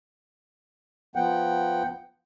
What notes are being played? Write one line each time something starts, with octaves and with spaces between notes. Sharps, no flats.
F3 B3 F#5 G5